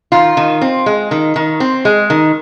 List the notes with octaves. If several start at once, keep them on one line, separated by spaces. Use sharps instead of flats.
D#3 F4
D#3
C4
G#3
D#3
D#3
C4
G#3
D#3